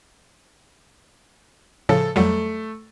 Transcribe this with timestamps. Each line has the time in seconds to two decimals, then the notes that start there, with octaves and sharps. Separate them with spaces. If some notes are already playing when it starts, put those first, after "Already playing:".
1.89 A2 C#3 F3 A4
2.16 F2 F#3 G3 A3